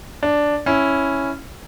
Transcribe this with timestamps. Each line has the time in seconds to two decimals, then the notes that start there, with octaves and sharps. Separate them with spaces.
0.23 D4
0.66 C#4 E4